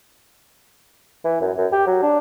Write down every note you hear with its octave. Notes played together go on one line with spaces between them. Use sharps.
E3
F#2
F#2
G4
F#3
D4